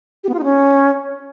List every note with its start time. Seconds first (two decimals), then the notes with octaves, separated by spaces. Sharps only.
0.24 G4
0.29 B3
0.34 F4
0.39 D#4
0.44 C#4